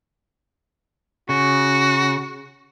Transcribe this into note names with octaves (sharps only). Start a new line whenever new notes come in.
C#3 F#4